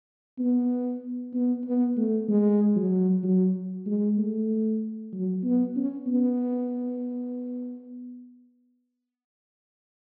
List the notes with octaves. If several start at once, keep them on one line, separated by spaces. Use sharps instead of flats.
B3
B3
B3
A3
G#3
F#3
F#3
G#3
A3
F#3
B3
C#4
B3